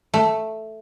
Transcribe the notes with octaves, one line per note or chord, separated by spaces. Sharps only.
A3